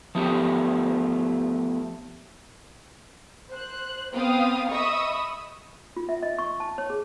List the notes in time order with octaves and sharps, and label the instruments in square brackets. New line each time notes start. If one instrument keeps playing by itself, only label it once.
[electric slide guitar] F3 A3 B3 G4
[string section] C5 F#6
B3 C4 F5 G5 D#6
D#5 E5 B5 C#6 D#6 E6
[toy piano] F4
E5
D#5
C#6
A5
C#5
G#4